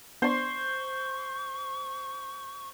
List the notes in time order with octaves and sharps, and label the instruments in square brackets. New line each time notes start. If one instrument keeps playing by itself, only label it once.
[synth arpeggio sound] B3 D4 D5 [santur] C5 C6 [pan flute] C#6